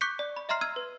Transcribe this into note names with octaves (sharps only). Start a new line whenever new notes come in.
C#6 D6 F#6 G6 B6 C#7
D5
B5
D#5 E5 A#5 C6 F6 C7
E6 F6 G#6 D#7
B4